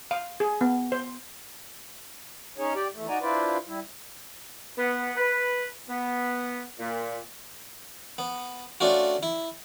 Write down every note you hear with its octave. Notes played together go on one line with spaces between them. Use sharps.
F5
G#4
B3
C5
C#4 D#4 G#4 C#5
G4 D5
E2 A3
D#4 F#4 D5 G#5 A#5
D4 E4 F4 B4 C5 D5
G3 E4
B3
B4
B3
A#2
B3
A3 C#4 D4 F4 F#4
E4